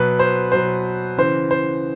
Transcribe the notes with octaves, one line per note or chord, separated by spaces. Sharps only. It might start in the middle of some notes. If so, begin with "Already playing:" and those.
Already playing: B2 F#3 B4
C5
B2 F#3 C5
C#3 E3 C5
C5